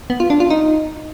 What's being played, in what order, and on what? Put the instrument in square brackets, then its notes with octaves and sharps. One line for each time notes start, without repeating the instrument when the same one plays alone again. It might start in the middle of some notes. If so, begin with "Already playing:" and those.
[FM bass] B3
F4
D4
F4
D#4